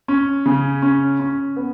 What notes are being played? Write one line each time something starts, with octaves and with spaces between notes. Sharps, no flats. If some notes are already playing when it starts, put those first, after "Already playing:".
C#4
C#3
C#4
C#4
B3